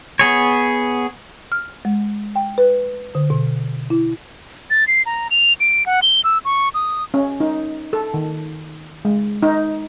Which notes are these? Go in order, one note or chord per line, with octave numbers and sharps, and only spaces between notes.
B3 G#4 C#5
F6
G#3
G5
B4
D3
B2
E4
A6
C7
A#5
F7
D7
F#5
G7
E6
C#6
D#6
C#4
D#4
A4
D#3
G#3
D#4